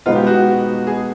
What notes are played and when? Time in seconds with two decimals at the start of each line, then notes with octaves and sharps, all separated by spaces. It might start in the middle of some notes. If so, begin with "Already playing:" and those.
0.06 B2 G#3 B3 D#4 F4
0.15 G4
0.27 F#4
0.87 G#4